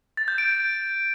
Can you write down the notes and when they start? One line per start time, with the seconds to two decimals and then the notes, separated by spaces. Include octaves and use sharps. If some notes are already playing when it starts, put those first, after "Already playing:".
0.17 A6
0.28 G6
0.38 D7